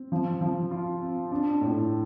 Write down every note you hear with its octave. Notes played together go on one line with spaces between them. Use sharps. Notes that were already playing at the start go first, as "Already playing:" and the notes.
Already playing: C4
F3
F3
F4
C4
D4
A2